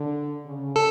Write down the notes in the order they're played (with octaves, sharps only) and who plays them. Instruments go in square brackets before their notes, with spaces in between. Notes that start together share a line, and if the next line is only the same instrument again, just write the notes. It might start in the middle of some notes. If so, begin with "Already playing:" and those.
Already playing: [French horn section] D3
C#3
[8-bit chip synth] A4